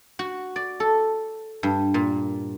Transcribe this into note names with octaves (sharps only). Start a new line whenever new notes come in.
F#4
D5
A4
G2
A#2